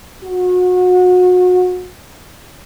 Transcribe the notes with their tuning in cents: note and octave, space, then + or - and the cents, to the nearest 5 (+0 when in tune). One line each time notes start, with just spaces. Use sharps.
F#4 -30